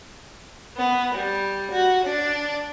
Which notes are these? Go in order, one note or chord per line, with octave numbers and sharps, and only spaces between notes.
B3
G3
F#4
D4